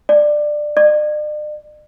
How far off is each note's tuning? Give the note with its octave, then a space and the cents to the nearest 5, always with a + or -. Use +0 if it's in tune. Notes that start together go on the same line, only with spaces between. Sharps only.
D5 +15
D5 +45